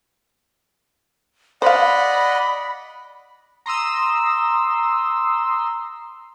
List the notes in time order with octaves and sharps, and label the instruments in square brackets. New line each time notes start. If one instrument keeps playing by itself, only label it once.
[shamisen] C5 F5 [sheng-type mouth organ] D5 D#5 F#5 [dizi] B5
[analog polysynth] A#5 C6 D#6 E6